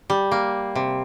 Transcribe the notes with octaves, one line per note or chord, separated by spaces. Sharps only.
G3
A#3
C3